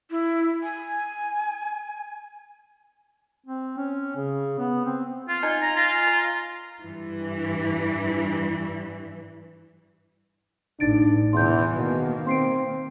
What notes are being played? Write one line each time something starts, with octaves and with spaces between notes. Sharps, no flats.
E4
G#5
C4
C#4
C#3
B3
C4
F4
D#4 G#5
A#5
F4
A#5
G2 E3
A1 D4 D#4 A6 D7
E2 C3 E3 C6 G6
B2 D#3 A#3
C4 C6 C7 D7